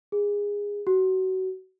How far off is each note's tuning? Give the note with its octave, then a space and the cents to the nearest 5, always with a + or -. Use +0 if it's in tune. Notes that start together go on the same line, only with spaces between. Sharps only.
G#4 -20
F#4 +25